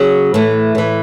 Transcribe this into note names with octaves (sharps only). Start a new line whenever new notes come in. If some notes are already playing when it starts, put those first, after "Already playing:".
Already playing: C#3 F#3
A2 E3 A3
A2 E3